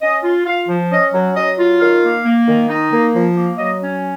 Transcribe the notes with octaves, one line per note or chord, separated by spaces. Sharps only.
C#4 D#5
F4
F4 F5
F3
C#4 D#5
F#3
F#3 D#5
F4
D#3 F5
A#3
A#3
D#3
D#4
A#3
F3
A#3
F#3 D#5
C#4